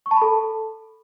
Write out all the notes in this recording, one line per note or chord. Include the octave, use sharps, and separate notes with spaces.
C#6
A5
B5
A4